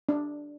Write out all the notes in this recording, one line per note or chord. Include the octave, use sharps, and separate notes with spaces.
D4